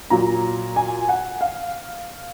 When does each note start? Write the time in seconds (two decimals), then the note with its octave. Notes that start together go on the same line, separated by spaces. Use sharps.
0.10 A#2 F#3 A#5
0.76 G#5
1.09 F#5
1.41 F5